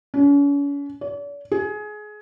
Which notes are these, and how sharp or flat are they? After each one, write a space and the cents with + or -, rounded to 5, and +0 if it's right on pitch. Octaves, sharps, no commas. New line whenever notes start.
C#4 +40
D5 -45
G#4 +20